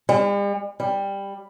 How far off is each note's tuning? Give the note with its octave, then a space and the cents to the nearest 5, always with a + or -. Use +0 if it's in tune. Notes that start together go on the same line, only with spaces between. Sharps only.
G3 +45
G3 +15